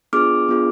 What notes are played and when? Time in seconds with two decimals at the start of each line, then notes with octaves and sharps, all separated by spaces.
0.13 B3 D4 F4 G#4 D6 F6
0.49 B3 D4 F4 G#4